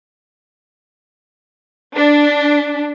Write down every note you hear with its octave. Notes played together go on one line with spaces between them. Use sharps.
D4